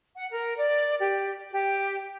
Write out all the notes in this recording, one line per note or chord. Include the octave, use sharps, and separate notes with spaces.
F#5
A#4
D5
G4
G4